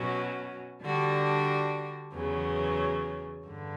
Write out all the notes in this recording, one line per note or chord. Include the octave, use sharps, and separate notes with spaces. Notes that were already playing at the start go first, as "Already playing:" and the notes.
Already playing: B2 F#3 C#4 F#4
D3 G3 D4 F#4
E2 C#3 F#3 B3
G2 D3